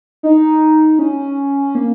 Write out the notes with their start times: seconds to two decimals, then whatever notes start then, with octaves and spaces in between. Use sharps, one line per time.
0.23 D#4
0.99 C#4
1.75 A#3